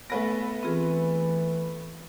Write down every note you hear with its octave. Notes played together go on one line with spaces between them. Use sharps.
A3 B3 B4 G#5 A#6
E3 C4 F4 G#4